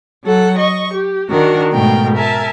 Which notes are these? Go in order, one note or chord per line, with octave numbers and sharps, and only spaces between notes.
F#3 A4 F#5
D#5 C#6
G4
D#3 D4 F#4 A#4
G#2 B2 A3 A#4 G5
A#4 E5 G#5 A5